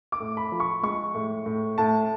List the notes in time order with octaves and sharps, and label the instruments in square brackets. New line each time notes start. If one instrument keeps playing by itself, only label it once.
[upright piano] D6
A2
B5
F3
C#6
G#3 C#6
A2
A2
A2 A5